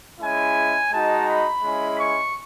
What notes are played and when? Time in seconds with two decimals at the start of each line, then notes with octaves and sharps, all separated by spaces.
0.20 G#3 C#4 E4 G#5
0.92 G#3 D#4 F#4 A5
1.26 B5
1.63 G#3 C#4 E4
1.97 C#6